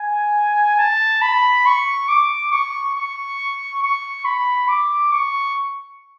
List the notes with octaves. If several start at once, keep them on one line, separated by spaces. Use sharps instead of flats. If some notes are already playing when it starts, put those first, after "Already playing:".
Already playing: G#5
A5
B5
C#6
D6
C#6
C#6
C#6
B5
D6
C#6